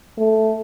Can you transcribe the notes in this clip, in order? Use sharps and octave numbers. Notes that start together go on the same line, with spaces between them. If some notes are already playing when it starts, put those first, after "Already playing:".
A3